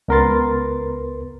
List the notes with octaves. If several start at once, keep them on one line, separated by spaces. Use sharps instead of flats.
C#2 B3 A#4 B4 C6 A6